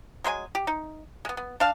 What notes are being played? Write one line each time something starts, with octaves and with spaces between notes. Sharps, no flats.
F#3 G#3 C5 G#5
G4
D#4
G#3 B3
B3
D4 F5 A5